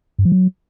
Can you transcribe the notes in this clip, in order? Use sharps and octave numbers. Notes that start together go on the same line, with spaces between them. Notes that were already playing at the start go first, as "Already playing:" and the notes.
G2
F3
F#3